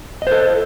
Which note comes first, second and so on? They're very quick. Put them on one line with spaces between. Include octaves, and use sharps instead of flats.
D#5 C5 A4